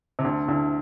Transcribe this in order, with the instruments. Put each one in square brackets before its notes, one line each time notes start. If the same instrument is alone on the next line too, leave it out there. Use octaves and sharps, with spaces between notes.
[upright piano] C3
D2 D3
D2 D3